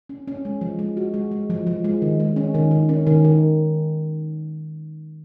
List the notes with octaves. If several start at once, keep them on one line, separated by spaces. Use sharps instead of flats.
C#4
C#4
G#3
F3
G#3
F#4
G#3
G#3
F3
F3
G#3
D#3
G#3
C#4
D#3
D#3
C#4
D#3
D#3